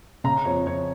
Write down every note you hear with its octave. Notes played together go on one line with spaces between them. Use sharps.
C#3 A#5
F2 C#5
F2 C#5